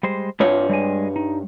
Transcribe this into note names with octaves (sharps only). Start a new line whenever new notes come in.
G3 G#3 C5
G2 F4 C#5
G3 G#3 G#5
D#4